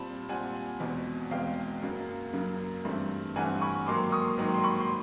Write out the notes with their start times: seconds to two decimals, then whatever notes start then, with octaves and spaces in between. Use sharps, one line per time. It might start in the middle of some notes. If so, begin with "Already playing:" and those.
Already playing: A#2 G3 C4 A5 B5
0.29 A#2 G3 C4 F#5 G#5
0.80 E2 B2 G#3 C4
1.31 E2 B2 G#3 C4 F5 G5
1.82 F#2 C#3 F#3 A#3
2.33 F#2 C#3 F#3 A#3
2.85 G2 E3 A3 C4
3.36 G2 E3 A3 C4 F#5 G#5
3.61 B5 C#6
3.86 G#2 D#3 F#3 A#3 C6 D6
4.12 C#6 D#6
4.37 G#2 D#3 F#3 A#3
4.54 C6
4.64 B5 C#6
4.80 C6